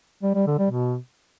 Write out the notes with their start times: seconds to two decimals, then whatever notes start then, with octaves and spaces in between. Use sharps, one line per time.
0.23 G3
0.35 G3
0.47 D3
0.59 G3
0.70 B2